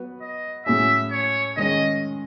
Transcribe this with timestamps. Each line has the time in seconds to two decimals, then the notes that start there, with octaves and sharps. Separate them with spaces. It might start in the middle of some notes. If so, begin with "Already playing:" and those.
Already playing: F#3 B3 F#4 B4
0.21 D#5
0.66 A2 F#3 C#4 G#4 E5
1.12 C#5
1.57 D#3 G#3 C#4 G#4 D#5